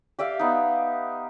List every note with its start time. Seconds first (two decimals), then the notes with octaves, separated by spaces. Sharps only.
0.19 G4 D5 E5 F5
0.39 B3 D#4